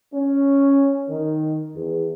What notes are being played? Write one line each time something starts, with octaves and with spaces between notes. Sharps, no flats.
C#4
D#3
E2